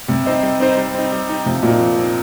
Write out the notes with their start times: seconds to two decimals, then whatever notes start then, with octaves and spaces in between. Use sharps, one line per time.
0.08 C3 G3
0.26 C4 D#4 C5 D#5
0.43 G3
0.60 C4 D#4 C5 D#5
0.77 G3
0.95 C4 D#4
1.12 G3
1.29 C4 D#4
1.46 C3 F3
1.63 A#2 C4 D#4
1.80 F3
1.97 C4 D#4